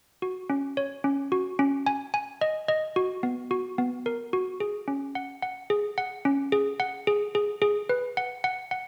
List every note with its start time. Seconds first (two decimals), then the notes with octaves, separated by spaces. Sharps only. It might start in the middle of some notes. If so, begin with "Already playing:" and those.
0.22 F#4
0.50 C#4
0.77 C#5
1.04 C#4
1.32 F#4
1.59 C#4
1.86 G#5
2.14 G#5
2.41 D#5
2.68 D#5
2.96 F#4
3.23 B3
3.51 F#4
3.78 B3
4.06 A#4
4.33 F#4
4.60 G#4
4.88 C#4
5.15 F#5
5.42 F#5
5.70 G#4
5.98 F#5
6.25 C#4
6.52 G#4
6.80 F#5
7.07 G#4
7.35 G#4
7.62 G#4
7.89 B4
8.17 F#5
8.44 F#5
8.71 F#5